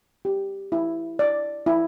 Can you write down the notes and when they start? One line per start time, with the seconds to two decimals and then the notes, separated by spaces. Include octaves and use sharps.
0.25 G4
0.72 E4
1.19 D5
1.66 E4